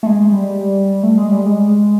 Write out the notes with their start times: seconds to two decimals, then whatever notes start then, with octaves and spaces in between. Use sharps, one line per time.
0.03 A3
0.06 G#3
0.32 G3
1.03 A3
1.17 G#3
1.32 G3
1.46 G#3